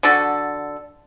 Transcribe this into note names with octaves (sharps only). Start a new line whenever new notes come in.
D3 F#4 A4